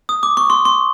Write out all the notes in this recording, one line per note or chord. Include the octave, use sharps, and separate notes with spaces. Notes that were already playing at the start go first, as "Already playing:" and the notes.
D#6
D6
C#6
C6
C6